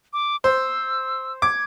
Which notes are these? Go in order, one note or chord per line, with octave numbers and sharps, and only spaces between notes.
D6
C5 E6
D6 G#6